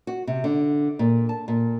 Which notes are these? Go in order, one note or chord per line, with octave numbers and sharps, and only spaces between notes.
F#4
C3
D3
A#2
A5
A#2